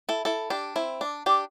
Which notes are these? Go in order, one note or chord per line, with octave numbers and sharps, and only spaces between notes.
E4 A4
E4 A4
D4 G4
C4 E4
D4
D4 G4